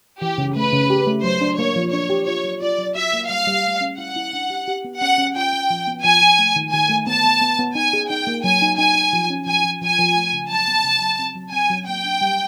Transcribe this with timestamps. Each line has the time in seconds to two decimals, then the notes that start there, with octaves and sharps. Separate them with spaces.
0.22 E3 G4
0.38 C#3
0.56 A3 B4
0.72 C#3
0.90 G4
1.07 A3
1.24 F#3 C5
1.41 D4
1.59 A#3 C#5
1.76 F3
1.92 D4 C#5
2.10 G4
2.27 F4 C#5
2.44 F#3
2.62 F4 D5
2.78 F#3
2.95 F#4 E5
3.13 A#3
3.29 G3 F5
3.47 G3
3.65 A3
3.81 C#4
3.98 E4 F#5
4.16 E4
4.33 D4
4.50 G4
4.68 G4
4.85 B3
5.01 C#4 F#5
5.18 C#4
5.36 F4 G5
5.53 C#4
5.70 F3
5.87 B3
6.04 F3 G#5
6.21 F3
6.38 A3
6.56 D#3
6.72 D#3 G#5
6.89 A3
7.07 B3 A5
7.24 B3
7.41 B3
7.59 B3
7.75 D#4 G#5
7.93 G#4
8.10 D#4 G5
8.27 A#3
8.44 F#3 G#5
8.62 D#4
8.78 D#4 G#5
8.95 D#4
9.13 F3
9.30 C#4
9.46 F3 G#5
9.64 F3
9.82 F3 G#5
9.99 F3
10.15 A3
10.33 C#3
10.50 F#3 A5
10.68 B3
10.84 C#3
11.01 F#3
11.19 C4
11.35 F#3
11.52 C4 G#5
11.70 F#3
11.87 A#3 G5
12.05 D4
12.21 G3